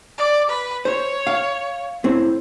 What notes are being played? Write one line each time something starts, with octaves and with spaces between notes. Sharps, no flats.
D5
B4
C5 C#5
F5
A2 C4